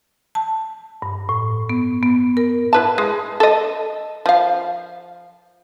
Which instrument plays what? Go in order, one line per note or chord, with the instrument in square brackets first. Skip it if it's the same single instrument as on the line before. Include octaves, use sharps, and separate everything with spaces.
[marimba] A5
G2
A2
B3
B3
A#4
[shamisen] E4 B4 A5
G#3
A4 D#5
F3 F5